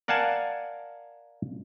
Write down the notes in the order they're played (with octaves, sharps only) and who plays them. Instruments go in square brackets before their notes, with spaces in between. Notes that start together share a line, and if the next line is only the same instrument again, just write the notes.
[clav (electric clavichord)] A#4 D5 F5 F#5 G#5 A5